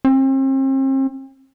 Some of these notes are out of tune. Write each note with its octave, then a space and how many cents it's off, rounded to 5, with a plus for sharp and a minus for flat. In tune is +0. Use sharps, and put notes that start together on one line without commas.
C4 +40